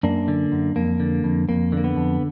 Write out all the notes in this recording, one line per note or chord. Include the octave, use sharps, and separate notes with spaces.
F#2 A#3 D4
D3
F#2
F2 A#3
D3
F2
F2 A#3
D3 A#3
B3
F2